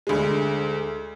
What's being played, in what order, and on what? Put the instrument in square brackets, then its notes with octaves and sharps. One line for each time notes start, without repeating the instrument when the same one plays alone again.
[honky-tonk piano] D2 G#3